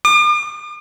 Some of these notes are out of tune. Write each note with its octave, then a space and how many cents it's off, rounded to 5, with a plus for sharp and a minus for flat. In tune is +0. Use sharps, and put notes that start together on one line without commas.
D6 +45